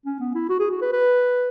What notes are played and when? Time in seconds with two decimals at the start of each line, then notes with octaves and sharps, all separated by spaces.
0.05 C#4
0.20 B3
0.35 E4
0.49 F#4
0.60 G#4
0.71 F#4
0.82 B4
0.93 B4